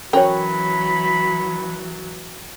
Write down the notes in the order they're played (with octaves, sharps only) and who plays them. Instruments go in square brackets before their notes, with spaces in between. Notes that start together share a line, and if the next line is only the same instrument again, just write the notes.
[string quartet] E3 F#3 [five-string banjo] C#4 F#4 C#5 [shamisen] A#4 G5 [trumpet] B5